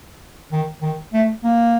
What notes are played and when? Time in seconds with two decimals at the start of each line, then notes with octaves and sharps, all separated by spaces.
0.52 D#3
0.82 D#3
1.13 A3
1.44 A#3